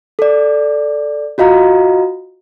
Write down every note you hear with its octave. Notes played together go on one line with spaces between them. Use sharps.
A4 D5
F4 F#4 D#5 F5 A#5